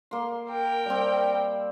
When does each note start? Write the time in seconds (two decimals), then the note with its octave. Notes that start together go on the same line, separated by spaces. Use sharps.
0.11 A#3 C6
0.51 A#4 G5
0.86 G3 C4